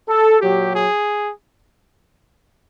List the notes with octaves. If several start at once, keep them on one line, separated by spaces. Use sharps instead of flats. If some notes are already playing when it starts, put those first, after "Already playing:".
A4
A#2 F#3 G4
G#4